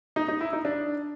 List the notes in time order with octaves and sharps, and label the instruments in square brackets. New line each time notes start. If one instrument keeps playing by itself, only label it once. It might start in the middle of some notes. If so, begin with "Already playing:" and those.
[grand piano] D#4
D#4
E4
D#4
D4